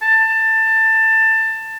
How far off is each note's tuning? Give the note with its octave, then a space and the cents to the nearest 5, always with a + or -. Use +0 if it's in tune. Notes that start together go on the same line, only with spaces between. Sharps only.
A5 +20